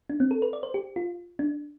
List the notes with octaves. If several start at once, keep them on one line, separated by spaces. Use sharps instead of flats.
D4
C4
A4
B4
D5
C5
G4
F4
D4